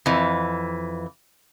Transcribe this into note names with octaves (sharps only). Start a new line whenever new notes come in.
F2 E3